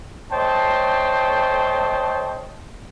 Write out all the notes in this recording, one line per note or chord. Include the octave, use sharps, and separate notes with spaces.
A3 C5 C#5 D#5 G5 A5